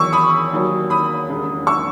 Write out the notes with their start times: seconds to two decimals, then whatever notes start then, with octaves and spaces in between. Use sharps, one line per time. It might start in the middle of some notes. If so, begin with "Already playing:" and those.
Already playing: E2 D#3 F#3 C#6 E6
0.13 B5 D#6
0.52 D#2 D#3 F#3
0.90 B5 D#6
1.28 E1 D#2 C#3
1.67 C#6 E6